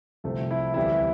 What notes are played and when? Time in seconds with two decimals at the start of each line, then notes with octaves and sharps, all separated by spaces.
0.24 C2 C3 F3 A3 C4
0.51 E4
0.74 D2 C3 E3 G3 B3 E4